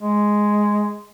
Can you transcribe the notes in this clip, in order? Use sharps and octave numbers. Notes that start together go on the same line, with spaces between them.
G#3